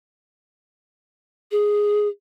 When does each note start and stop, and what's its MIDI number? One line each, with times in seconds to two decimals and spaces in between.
1.51 2.08 68